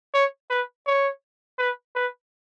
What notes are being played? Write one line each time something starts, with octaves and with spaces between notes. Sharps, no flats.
C#5
B4
C#5
B4
B4